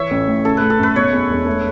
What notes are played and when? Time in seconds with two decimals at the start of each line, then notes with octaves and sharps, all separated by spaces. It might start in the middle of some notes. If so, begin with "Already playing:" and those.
Already playing: E3 C#5 E5
0.11 A1
0.28 A2
0.45 C#3 A4
0.57 A3 B4
0.70 A4
0.79 F#2 B4
0.96 B2 C#5
1.13 E2
1.29 E1
1.46 A3